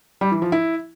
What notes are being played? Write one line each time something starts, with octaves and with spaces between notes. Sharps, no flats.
G3
E3
F3
E4